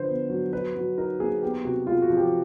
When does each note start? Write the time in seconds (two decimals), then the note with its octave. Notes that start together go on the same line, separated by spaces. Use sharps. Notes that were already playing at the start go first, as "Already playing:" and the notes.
Already playing: D3 F3 B4 C5
0.08 B3
0.30 F#3
0.53 F#3 B4
0.76 F#3
0.98 D#4 A#4
1.20 A#3 G#4
1.42 B3 G4
1.65 C3 F#4
1.87 G#3 F4
2.02 F#4
2.10 F3
2.17 G4